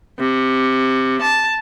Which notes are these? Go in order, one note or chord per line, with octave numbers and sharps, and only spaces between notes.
C3
A5